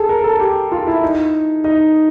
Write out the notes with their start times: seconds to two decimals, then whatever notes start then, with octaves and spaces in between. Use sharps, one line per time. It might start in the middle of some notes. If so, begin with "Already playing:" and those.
Already playing: G#4 A4
0.09 A#4
0.24 A4
0.40 G4
0.72 F4
0.87 E4
1.03 D#4
1.64 D#4